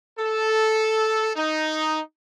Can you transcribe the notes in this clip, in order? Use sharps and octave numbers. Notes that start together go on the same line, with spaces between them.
A4
D#4